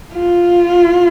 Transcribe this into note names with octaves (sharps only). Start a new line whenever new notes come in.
F4